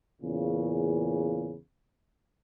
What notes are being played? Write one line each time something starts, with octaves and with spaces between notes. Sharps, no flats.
E2 A#2 C#3